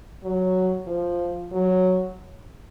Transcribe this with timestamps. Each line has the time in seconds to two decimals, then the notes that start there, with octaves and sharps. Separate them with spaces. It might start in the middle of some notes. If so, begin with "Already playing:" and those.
0.23 F#3
0.87 F3
1.52 F#3